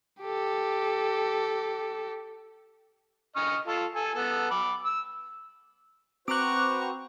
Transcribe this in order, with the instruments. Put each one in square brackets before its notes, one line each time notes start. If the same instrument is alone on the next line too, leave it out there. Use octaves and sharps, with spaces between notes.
[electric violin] G4 A4
[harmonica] D#5 C#6 F6
F4 A4
A4 G#5
B3 A4
B5 D6
E6
[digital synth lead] C4 [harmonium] F#4 B4 C5 [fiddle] A#5 C#6 [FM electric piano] D6 F#6